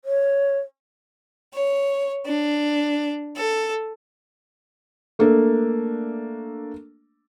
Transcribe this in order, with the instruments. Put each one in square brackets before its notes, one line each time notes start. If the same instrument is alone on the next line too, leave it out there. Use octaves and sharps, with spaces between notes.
[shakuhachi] C#5
[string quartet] C#5
D4
A4
[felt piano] A3 A#3 D4 A4